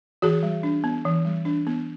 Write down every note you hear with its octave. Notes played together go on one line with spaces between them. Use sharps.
E3 F#4 G#4
G3
D4
B3
E3
G3
D4
B3